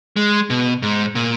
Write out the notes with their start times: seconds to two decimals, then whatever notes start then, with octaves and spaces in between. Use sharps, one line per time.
0.16 G#3
0.50 B2
0.82 G#2
1.15 A#2